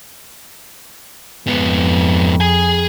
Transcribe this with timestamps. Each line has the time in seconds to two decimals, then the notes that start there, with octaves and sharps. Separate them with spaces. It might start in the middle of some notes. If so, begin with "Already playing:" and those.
1.47 F2 G#2 B3
2.41 G#4 G#5